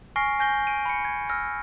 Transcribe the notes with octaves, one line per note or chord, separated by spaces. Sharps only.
G#5 C#6 F6 A#6 C7 D7
G#5 G6 A#6 G7
D7 D#7
B5 C#7
G#6
E6 F6 A#6